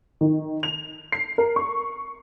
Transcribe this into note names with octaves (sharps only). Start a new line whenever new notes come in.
D#3
F7
C7
A#4
C#6